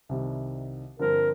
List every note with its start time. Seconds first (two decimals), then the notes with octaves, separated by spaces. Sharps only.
0.09 C2 C3 D#3 G3
0.99 G2 D3 F3 C4 A#4